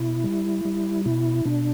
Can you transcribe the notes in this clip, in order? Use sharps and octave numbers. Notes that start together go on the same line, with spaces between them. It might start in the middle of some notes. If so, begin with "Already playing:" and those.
Already playing: B2 E4
G3
G3
B2 E4
B2 D4